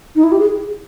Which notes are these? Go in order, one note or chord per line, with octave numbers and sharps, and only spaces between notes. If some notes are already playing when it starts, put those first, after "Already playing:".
D#4
E4
G4
G#4